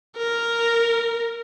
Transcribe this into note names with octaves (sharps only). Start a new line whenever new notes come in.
A#4